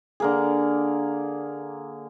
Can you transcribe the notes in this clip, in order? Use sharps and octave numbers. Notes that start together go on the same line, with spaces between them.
D3 A#3 G#4